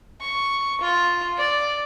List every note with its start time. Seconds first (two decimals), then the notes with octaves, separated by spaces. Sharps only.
0.21 C#6
0.81 F4
1.38 D5